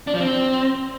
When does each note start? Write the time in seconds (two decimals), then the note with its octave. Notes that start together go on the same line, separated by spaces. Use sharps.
0.07 D4
0.14 F3
0.21 C4